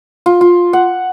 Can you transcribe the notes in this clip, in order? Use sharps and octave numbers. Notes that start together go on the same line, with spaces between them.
F4
F4
F#5